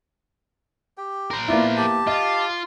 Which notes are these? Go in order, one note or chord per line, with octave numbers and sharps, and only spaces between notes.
G4 G5
A#4 C5
A#3 B3 E4 F4 D5
G4 A5
F4 D#5